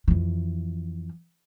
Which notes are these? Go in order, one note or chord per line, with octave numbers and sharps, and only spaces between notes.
F2 E3